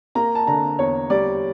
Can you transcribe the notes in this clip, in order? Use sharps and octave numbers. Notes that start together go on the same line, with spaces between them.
A#3 A#5
A5
D3 A#5
E2 C#5
G3 D5